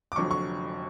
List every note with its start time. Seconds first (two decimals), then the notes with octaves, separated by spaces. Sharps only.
0.12 D6
0.16 F1 F2 D3 F#3 C#6
0.31 C#6